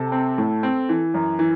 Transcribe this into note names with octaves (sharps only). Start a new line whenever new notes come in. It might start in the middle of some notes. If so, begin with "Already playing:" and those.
Already playing: C3 A4
C4
A2
C4
E3
F#2
E3